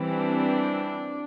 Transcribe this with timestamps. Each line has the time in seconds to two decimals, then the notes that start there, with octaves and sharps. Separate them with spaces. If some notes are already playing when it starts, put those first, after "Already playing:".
Already playing: E3 G3 C4
0.12 D4